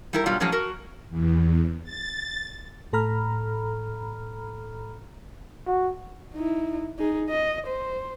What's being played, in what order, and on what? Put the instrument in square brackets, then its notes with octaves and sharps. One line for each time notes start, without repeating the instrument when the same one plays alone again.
[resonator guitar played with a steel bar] G3 E4 A#4
G2 B2 F#3 G3 F4
A2 F3 F#3 A#3 C#4 G#4
F#4 A#4
[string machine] E2
A6
[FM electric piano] A2 A4 A#5 B5 F6
[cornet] F#4
[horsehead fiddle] D#4 E4
D#4 G#4
D#5
C5